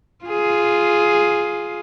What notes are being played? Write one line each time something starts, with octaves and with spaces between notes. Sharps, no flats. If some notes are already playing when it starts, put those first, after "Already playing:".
F4 G#4